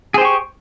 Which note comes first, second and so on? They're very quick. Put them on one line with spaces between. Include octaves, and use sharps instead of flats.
G#4 C5 G4 C#6